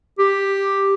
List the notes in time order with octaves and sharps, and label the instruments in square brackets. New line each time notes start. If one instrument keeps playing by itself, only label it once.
[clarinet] G4